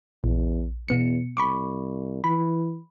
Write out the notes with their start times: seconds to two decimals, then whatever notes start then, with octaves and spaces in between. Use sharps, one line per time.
0.24 A#1 E2
0.88 E2 B2 B3 C#7
1.37 C2 B5 C#6 D6
2.24 E3 B5